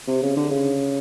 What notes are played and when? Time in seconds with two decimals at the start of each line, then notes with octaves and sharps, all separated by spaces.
0.08 C3
0.23 C#3
0.37 D3
0.51 C#3